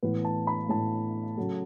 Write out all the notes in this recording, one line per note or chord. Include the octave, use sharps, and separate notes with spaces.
A2 E3 B3 B4
A5
B5
A2 E3 B3 A5
C#3 F#3 A3